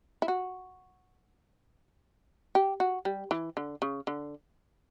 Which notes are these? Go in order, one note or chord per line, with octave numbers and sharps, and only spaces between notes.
E4
F#4
G4
F#4
G3
E3
D3
C#3
D3